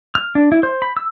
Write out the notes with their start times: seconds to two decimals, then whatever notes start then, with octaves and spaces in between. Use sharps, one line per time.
0.15 F6
0.35 D4
0.52 E4
0.63 C5
0.82 B5
0.97 E6